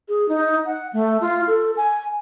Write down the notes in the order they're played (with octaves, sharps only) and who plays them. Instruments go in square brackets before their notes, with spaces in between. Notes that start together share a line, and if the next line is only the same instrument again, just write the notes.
[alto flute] G#4
D#4
F#5
A3
F4
A4
G#5